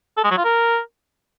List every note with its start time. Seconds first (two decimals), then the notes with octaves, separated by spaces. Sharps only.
0.17 A4
0.24 G#3
0.31 F#3
0.38 F4
0.44 A#4